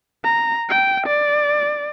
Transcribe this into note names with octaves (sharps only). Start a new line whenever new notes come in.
A#5
G5
D5